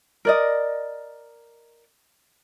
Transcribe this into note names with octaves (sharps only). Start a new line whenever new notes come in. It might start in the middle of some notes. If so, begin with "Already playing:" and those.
A#4 D5 D#5